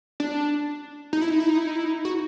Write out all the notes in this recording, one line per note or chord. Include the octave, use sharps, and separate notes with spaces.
D4
D#4
E4
D#4
E4
D#4
E4
D#4
E4
D#4
F#4